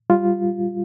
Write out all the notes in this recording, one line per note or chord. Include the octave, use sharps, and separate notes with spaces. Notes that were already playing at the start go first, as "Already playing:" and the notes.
G3 F4